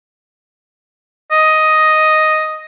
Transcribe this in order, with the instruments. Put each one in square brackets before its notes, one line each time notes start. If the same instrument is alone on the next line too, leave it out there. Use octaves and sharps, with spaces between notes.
[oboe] D#5